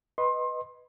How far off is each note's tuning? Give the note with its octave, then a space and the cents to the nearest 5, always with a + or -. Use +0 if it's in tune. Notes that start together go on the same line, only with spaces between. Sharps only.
B4 +0 D#5 +0 C6 +25